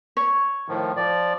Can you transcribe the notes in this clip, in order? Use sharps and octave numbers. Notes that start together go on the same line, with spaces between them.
C#5
A2 D#3 F3
F3 D5